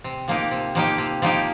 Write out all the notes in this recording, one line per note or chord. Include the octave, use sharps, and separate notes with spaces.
C3
F3 A#3 D#4 G4
C3
F3 A#3 D#4 G4
C3
F3 A#3 D#4 G4